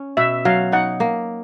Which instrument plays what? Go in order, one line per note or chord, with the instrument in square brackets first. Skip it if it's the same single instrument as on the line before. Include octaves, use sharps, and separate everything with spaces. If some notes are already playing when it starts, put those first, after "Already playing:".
Already playing: [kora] C#4
[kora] B2 [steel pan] E5
[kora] F#3 [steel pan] F5
[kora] D#4 [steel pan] F#5
[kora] A#3